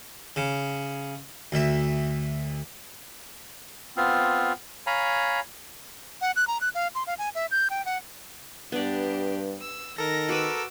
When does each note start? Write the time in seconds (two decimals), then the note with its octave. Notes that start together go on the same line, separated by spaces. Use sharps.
0.36 C#3
1.52 D2 E5
3.97 B3 C4 F4
4.87 C#5 F5 G#5 A#5 B5
6.21 F#5
6.36 F#6
6.47 A#5
6.61 F#6
6.75 F5
6.95 C6
7.07 F5
7.18 G#5
7.35 E5
7.51 G6
7.70 G5
7.85 F#5
8.72 G2 B3 D4 G4 D5
9.60 E6
9.98 D#3 A4 A#4 A#6
10.29 F#4 B4 D6 E6